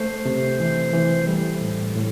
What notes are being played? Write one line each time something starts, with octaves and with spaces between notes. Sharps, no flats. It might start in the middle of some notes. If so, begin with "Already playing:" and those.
Already playing: A3 C5
C3
E3
E3
G3 A4
A2
A2